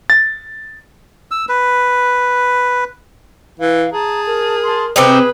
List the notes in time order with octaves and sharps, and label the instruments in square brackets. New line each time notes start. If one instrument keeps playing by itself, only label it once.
[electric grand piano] A6
[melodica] E6
B4
[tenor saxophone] E3 [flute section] F5
[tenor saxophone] G#4 [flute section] A5 [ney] A#5
[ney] A#4
[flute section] A5 C6
[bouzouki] C3 C4 D#4 [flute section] G#4 B4